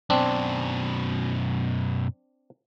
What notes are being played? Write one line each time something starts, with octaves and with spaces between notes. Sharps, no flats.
F#2 B2 C4 D4